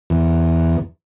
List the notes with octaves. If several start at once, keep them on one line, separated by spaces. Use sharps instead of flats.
E2